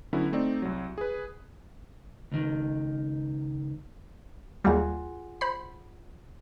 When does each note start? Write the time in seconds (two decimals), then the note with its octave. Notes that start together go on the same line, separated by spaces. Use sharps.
0.13 D3 F#3 B3 C#4 E4
0.32 A3 C4 D#4 D5
0.62 C2 F#3
0.98 G#4 B4
2.31 C#2 D#3
4.64 D#2 G3 F4 F#4 G#4
5.41 C5 B5